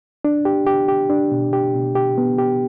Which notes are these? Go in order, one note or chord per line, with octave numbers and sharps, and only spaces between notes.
D4
G4
G4
G4
D4
B2
G4
B2
G4
B3
G4